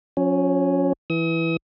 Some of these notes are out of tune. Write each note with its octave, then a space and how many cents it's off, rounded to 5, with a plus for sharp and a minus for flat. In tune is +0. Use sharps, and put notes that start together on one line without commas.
F3 +45 C#4 +0
E3 +0 D#6 +40